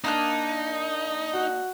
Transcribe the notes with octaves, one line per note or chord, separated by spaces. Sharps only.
A#3 D4 D#4 F#6
F#4